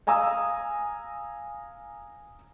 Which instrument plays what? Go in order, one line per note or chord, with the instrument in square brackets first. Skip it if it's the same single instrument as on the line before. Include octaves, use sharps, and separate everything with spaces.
[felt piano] F5 G#5 A#5 D#6 E6